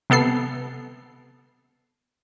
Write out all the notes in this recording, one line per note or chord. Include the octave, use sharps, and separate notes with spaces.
C3 B3 A4 C7